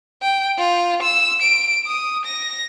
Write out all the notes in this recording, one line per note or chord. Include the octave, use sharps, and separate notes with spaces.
G5
F4
E6
D7
D#6
A#6